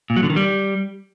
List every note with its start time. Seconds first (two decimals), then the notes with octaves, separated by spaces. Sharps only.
0.10 A#2
0.16 F#3
0.23 D3
0.30 D#3
0.36 G3